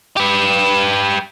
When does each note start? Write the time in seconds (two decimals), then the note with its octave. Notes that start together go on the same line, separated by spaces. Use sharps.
0.17 G4 B4